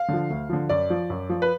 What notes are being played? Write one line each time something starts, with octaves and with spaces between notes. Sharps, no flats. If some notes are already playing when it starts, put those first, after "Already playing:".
Already playing: F5
D3 F3
D2
D3 F3
F#2 D5
F3
F#2
F3
B4